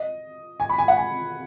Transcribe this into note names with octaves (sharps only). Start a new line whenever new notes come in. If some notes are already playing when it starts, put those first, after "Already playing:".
Already playing: D#5
G#5
B5
G#5
F#5
G#5